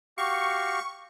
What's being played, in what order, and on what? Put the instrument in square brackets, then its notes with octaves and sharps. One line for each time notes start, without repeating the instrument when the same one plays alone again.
[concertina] F#4 G4 F5 [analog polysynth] C#6